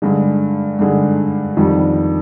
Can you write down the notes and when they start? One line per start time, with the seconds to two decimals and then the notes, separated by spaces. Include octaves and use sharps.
0.02 G2 D3 G#3
0.79 G2 D3 G#3
1.57 F2 D#3 G3